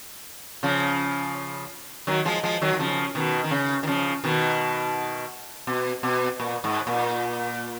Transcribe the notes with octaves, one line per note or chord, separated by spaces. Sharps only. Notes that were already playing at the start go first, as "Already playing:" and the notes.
C#3 F3
D#3 F#3
F3 G#3
F3 G#3
D#3 F#3
D#3
C#3 F3
B2 D#3
D#3
C#3
D#3
C#3 F3
B2 D#3
B2
B2
A#2
G#2
A#2